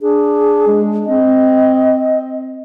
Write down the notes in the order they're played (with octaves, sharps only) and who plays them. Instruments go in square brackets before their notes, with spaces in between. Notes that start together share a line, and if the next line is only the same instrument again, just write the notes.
[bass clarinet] D4 [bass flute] G#4
[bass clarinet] G#3
[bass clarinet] C4 [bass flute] D#5